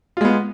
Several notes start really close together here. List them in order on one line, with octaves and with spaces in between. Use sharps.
F4 G#3 B3